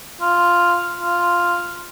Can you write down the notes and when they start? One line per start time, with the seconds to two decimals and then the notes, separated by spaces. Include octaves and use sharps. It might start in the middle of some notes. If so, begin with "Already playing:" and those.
0.21 F4
1.01 F4